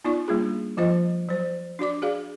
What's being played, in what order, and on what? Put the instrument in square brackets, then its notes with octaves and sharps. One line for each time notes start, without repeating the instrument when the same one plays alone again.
[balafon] B3 D#4 F4 D5 C#6
G3 A#3 D4 F4 G#4
F3 F4 C5 D#5
F#3 C5
D4 F#4 D5 D6
F#4 G#4 D5 F5